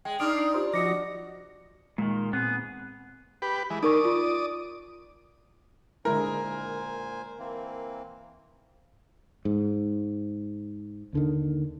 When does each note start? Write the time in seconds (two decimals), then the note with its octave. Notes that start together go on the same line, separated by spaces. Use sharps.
0.05 G#3 G5
0.20 D4 D#4 C6 D6 D#6 F6
0.54 F4 G4 C5 D5
0.74 F3 F#4 D#5 D6 A#6 C#7
1.98 A#2 D#3 G#3
2.33 A#2 B3 C4 G#4
3.42 G4 B4
3.70 E3 G#3
3.83 D#4 A#4 D5 C#6 D#6
4.05 F4
6.05 A#2 D3 G#3 E4 A#4 C5 G#5
7.39 E3 A#3 C4
9.45 G#2
11.13 D#2 D3 D#3